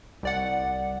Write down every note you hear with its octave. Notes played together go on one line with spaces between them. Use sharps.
C2 D5 F#5